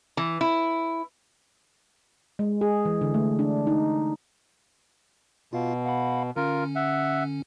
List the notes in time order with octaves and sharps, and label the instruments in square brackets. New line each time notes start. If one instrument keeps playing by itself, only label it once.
[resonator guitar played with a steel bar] E3
E4
[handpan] G#3
G#4
E3
D3
A3
D4
D#4
[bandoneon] B2 [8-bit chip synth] F4 F5
[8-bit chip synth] F5 F#5 B5
[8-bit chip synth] D3 C#4 [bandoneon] F4 A#4
[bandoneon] E5 F#5